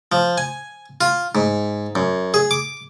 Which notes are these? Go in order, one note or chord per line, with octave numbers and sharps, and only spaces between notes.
F3
G#5
F4
G#2
F#2
G#4
D6